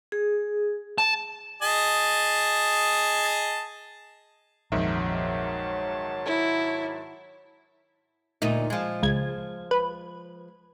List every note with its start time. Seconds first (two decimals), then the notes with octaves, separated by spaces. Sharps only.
0.12 G#4
0.98 A5
1.62 G#4 D#5 A5
4.72 A#1 F2 G#2 D#3 F#3 C#5 E5 A5
6.26 E4
8.42 D2 A#2 D#4
8.70 F3 G#3
9.03 C#2 G#6
9.71 B4